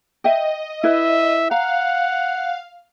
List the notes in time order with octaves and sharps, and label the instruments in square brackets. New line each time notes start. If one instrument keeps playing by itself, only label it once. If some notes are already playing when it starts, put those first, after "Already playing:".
[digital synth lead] D#5 [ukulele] E5 G5
[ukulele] E4 B4 [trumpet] E5
[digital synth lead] F5 [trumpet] F#5 [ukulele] A#5